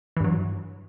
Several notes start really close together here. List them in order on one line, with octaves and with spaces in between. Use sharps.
E3 G2 F#3